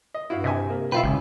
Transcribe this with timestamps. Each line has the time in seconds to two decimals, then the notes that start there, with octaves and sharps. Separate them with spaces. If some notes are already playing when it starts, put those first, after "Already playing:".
0.14 D#5
0.30 G2 E4 F#4 F5
0.44 C3 D#5 E5 G#5
0.70 A#3
0.92 B2 E4 F4 B4 G5
1.03 G#1 C#2 C#4